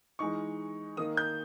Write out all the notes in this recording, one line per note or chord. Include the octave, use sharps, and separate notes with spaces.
E3 G#3 D#4 C#6
D#3 A#3 D#4 D#6
G6